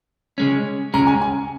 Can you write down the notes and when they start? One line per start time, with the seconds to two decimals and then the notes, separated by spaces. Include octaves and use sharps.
0.38 C#3 G#3 C#4
0.94 C#3 G#3 C#4 A#5
1.07 G#5
1.21 G#5